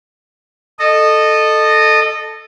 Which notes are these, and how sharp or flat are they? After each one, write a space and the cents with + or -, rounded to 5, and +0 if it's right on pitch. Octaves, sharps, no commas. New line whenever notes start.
A4 +0 D#5 -20